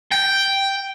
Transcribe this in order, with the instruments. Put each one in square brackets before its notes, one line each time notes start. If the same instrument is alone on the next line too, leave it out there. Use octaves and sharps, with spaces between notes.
[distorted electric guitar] G5